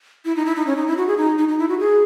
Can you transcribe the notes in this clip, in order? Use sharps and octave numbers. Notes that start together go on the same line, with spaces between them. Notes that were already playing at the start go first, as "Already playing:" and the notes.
E4
D#4
E4
D#4
C#4
D#4
E4
F#4
G#4
D#4
D#4
D#4
E4
F#4
G#4